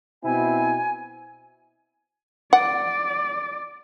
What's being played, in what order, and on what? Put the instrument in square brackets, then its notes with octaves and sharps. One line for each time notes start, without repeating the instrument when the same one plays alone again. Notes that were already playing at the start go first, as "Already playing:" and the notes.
[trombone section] B2 C4 E4 [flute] G#5
[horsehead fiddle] D5 [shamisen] F#5